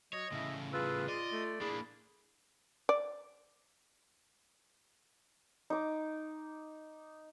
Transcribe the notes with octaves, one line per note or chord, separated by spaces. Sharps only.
F#3 C#5 D#5
A2 C#3 E4
F4 G#4 B4 E6
F4 D5 D#5
A3
A#3 D4 E4 G#4
D5
D#4 D6